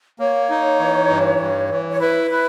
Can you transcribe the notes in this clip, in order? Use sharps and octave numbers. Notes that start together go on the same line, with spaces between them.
A#3 C#5
D#4
E3
G2
G2
E3
C#5
E4 B4
E4